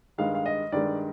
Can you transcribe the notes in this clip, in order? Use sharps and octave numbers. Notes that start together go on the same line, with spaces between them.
G2 D#3 G#3 F5
F5
D#5
G2 D#3 G#3 D5